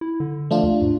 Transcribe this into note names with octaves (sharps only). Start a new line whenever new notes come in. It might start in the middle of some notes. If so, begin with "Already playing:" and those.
E4
D3
F3 A3 D4 F4
D#2
G#2